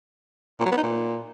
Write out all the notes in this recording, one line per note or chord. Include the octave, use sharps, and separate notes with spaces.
A#2
F#3
B3
D#4
A#2